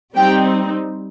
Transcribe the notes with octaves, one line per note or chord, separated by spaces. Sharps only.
G3 C4 D#4 G4 G5